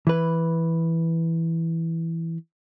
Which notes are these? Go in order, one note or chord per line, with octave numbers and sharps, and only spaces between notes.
E3 B4